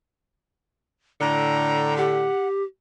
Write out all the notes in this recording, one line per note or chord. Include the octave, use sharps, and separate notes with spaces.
A2 D3 A#5
G4 F#5